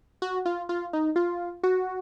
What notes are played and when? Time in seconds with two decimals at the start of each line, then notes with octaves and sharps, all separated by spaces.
0.22 F#4
0.46 F4
0.69 F4
0.93 D#4
1.16 F4
1.63 F#4